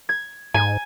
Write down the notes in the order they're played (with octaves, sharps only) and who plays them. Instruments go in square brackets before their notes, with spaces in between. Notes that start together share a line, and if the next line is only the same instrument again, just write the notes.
[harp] G#6
[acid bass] G#2 [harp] G#5